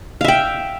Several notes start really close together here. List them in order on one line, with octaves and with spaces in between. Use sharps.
F5 E5 G5